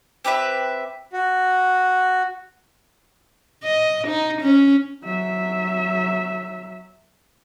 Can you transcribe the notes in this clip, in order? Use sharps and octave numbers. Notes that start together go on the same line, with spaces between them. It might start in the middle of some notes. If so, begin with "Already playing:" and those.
C4 G4 B4 E5
F#4
D#5
D#4
C#4
F#3 E5